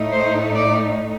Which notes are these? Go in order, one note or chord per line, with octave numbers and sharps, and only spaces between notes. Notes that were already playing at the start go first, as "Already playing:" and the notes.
Already playing: A2 A3 D#4
C5
D5